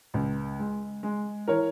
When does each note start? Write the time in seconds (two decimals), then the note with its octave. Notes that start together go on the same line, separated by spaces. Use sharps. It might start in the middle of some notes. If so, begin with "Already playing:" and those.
0.14 C#2
0.59 G#3
1.03 G#3
1.47 E3 A#4 C#5